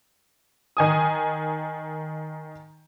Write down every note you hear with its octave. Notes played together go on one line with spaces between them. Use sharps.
D#3 G#5 D#6